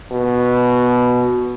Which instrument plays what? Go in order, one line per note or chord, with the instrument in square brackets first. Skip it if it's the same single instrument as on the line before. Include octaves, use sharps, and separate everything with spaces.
[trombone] B2